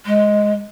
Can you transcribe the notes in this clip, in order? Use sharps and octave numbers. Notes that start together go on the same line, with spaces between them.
G#3